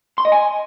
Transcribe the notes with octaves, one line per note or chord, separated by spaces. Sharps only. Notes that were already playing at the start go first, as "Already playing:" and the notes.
C6
D#5
G#5